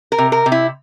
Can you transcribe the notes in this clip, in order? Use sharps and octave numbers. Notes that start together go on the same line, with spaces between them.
A#4
C3
A#4
C3
E4